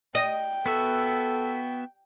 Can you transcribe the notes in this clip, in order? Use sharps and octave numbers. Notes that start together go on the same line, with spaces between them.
D#5 G5
B3 F#4 A4 E5